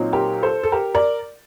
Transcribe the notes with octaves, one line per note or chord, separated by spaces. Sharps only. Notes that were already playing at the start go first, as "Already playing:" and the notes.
Already playing: A#2 F#3 C4 D#4
G4 A#4
A4 C5
A4
G4 A#4
A#4 D5